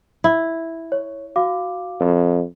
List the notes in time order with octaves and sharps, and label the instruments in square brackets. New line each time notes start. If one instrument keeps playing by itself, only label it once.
[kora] E4
[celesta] C#5
F#4 F5 D6
[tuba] F2